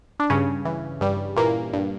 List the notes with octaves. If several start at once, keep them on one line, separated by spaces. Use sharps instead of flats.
D4
G2 C#3 C#4
E3
G2 G3
A#2 E3 A#3
G2